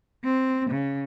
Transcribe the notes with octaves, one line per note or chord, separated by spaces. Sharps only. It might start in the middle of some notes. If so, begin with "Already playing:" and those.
C4
C#3